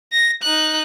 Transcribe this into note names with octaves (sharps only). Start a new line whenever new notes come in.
A#6
D#4 F#6